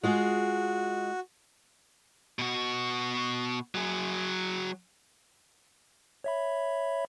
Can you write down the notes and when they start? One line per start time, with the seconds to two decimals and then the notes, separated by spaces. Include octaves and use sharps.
0.03 G#3 F4 F#4 G#4
2.39 B2 F#4
3.75 F#3 G#4
6.24 C#5 E5 B5